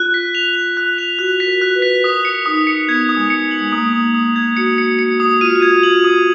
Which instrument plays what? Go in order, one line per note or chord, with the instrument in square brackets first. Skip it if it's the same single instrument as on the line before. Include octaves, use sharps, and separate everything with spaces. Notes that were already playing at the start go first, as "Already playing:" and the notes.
Already playing: [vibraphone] F4 [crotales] F#6
[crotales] B6
F7
F7
F#6
F7
[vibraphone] F#4 [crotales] F#6
[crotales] B6
[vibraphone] A#4
[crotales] F#6
[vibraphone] B4
[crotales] B6
[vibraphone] A#4 [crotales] D#6
[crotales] C#7
[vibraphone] D#4 [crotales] D#6
[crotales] C#7
[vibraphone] B3 [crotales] G#6
[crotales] D#6
[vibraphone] G#3
[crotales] C#7
F#7
[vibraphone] G#3
[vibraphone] A#3 [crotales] D#6
[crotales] D#6
D#6
G#6
[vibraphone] F#4 [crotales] C#7
[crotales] C#7
C#7
D#6
[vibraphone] F4 [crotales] D#7
[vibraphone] F#4
F4
[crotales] G#6
[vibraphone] F4 [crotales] F#7
[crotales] D#6